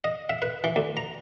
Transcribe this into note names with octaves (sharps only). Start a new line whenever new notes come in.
D#5
E5
B4
E3
D2
A#5